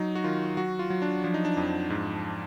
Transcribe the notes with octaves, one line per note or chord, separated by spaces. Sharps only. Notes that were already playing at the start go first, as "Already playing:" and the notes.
Already playing: F#3 D#4
F#4
D#3 F4
F#3 F#4
F4
F#3
D4
F3 D4
D#4
D4
F2
G#2